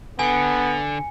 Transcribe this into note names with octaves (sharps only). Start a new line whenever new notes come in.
D3 B3 G#5 C#7